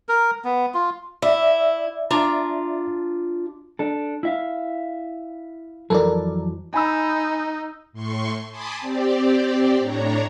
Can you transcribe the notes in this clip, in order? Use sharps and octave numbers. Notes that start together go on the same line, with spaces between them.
A#4
B3
F4
E4 D5 E5
D4 F4 A#5
D4 A4
E4 E5 F5
F2 E3 F#3 A4 A#4 D5
D#4 G#5 B5 E6
A2 C6 C#6
G#5 A5 B5 C6 D6 D#6
C4 G4 D5
A2 D4 C#5 A#5